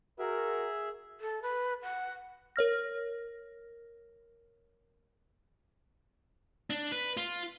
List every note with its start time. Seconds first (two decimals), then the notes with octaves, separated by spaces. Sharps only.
0.19 F#4 G#4 A#4 E5
1.21 A4
1.42 B4
1.83 F#5
2.56 A#4 C#5 F6 A#6
6.70 D4
6.92 B4
7.17 F4